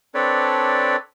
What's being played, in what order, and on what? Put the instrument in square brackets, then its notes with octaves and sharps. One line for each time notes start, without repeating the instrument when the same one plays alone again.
[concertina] C4 D4 A4 B4 C#5 D5